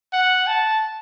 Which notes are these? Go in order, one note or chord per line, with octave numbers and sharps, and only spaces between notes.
F#5
A5